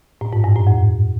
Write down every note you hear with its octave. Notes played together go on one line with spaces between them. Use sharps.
A2
G#2
G2
A2
F2